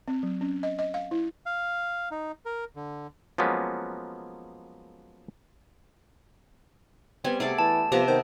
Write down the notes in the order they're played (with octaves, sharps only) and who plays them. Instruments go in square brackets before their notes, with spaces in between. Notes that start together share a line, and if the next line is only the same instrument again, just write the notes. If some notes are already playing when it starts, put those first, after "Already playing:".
[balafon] C4
F#3
C#4
D#5
D#5
F5
E4
[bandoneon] F5
D#4
A#4
D3
[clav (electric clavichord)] F3 F#3 G#3 A#3 B3 C#4
[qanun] G3 B3 G#5 [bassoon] C4
[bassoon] C3 [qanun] A3 G#4 D5
[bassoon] E3 [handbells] A5
[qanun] C3 B3 A#5 [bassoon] F3 [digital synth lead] G4
[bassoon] D#3 [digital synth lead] C5